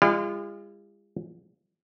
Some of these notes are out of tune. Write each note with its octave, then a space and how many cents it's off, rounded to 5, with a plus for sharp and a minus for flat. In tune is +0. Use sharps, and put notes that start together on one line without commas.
G#3 -45 F4 -35